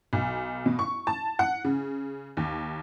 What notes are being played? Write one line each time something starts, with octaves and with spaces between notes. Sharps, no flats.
B1
B2
C#6
A5
F#5
C#3
D#2